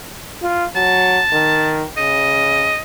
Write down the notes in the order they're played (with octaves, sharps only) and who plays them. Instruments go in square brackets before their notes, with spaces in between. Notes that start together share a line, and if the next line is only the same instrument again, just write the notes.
[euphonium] F4
[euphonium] F#3 [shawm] A5
[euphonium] D#3
[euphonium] C#3 [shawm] D#5